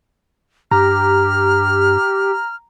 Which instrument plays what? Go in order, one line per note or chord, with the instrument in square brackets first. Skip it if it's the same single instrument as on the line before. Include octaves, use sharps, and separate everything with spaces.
[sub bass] G2 [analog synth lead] G4 [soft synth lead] A#5 [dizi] F6